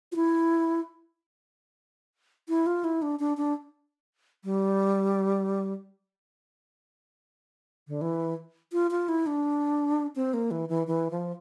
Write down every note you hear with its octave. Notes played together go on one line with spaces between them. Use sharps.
F4
E4
E4
F4
E4
D4
D4
D4
G3
D3
E3
F4
F4
E4
D4
C4
A#3
E3
E3
E3
F3